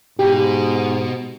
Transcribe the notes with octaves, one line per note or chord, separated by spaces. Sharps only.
G#2 B2 G4